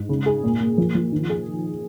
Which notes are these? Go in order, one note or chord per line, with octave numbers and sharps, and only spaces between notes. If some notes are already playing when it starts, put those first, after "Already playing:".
Already playing: G#2
C#3
G#4
A#2
A#2
F3
F3
D#3
G#4